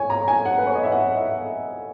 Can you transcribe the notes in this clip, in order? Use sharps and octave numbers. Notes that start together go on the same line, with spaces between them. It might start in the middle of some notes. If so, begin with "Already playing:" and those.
Already playing: C#5 G#5
A#5
G#5
F#5
B4
C#5
D#5
E5
F#5
E5